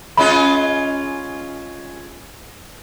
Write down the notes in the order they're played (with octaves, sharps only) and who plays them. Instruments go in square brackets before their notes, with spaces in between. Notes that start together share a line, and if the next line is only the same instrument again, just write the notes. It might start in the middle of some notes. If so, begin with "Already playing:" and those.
[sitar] G#3 C#4 F4 [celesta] B5